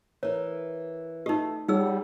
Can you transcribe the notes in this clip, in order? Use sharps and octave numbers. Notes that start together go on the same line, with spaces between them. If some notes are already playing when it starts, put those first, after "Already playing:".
E3 A#4 C#5
A3 D#4 G4 A4 D#5
G3 D#4 G#4 C#5 F#5 E6